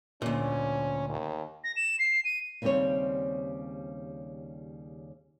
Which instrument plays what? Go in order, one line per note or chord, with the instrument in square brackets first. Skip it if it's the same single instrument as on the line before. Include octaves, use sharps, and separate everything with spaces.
[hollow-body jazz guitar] D2 A#2 [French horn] C#4
[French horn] D#2
[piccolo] A#6
E7
C7
D#7
[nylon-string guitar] D#2 C#3 G3 C4 C5 C#5